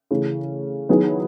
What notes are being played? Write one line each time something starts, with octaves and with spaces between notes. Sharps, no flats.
C#3 E3 A3
D#3 F#3 B3 E4 G#4